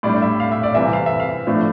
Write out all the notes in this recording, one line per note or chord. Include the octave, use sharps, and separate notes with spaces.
A2 G3 D4 D5
E5
F5
E5
D5
C3 E3 G3 E5
F5
E5
F5
A2 F3 A3 D4